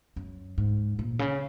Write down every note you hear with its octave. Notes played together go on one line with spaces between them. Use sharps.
F#2
G#2
A#2
C#3